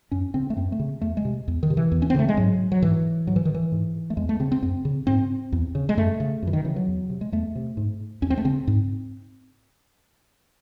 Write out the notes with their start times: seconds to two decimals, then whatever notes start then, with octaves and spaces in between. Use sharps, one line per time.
0.11 F#2 C#4
0.34 C#3 C4
0.50 A3
0.57 F#2 C4
0.72 A3
0.79 C#3
1.01 E2 A3
1.17 G#3
1.25 C3
1.48 E2
1.63 D#3
1.70 C3
1.77 E3
1.91 E2
2.02 C#4
2.10 C4
2.14 C#3 A3
2.29 G#3
2.37 G#2 F#3
2.72 F#3
2.82 G#2 E3
3.27 G#2 F#3
3.36 E3
3.45 D#3
3.54 E3
3.72 G#2
4.10 A3
4.17 E2 G#3
4.29 A3
4.40 C#3 C4
4.52 C4
4.62 F#2 C4
4.85 C#3
5.07 G#2 C4
5.52 E2
5.75 C#3
5.89 G#3
5.97 F#2 A3
6.20 C#3
6.42 F#2 E3
6.53 D#3
6.64 C#3 E3
6.76 F#3
6.88 E2
7.10 C3
7.21 G#3
7.32 E2 A3
7.55 C3
7.77 G#2
8.22 E2 C#4
8.30 C4
8.38 A3
8.45 C#3 C4
8.67 G#2